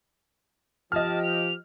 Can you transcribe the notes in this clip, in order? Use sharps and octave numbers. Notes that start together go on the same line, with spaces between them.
F3 G4 D#5 A5 F6
F7